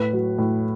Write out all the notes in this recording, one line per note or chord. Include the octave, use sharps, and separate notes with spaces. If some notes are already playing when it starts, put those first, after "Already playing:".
Already playing: A2 B4
F#3
A2